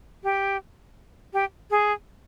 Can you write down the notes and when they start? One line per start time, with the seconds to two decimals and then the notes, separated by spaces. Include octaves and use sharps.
0.24 G4
1.34 G4
1.71 G#4